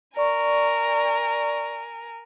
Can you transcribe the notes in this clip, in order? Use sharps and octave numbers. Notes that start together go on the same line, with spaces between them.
A#4 D5 G#5 C#6